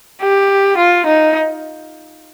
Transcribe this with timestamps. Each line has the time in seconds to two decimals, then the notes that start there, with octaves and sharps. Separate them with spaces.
0.22 G4
0.77 F4
1.06 D#4